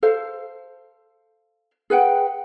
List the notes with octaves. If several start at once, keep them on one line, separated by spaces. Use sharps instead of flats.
A4 C5 F5
G#4 B4 F#5 G5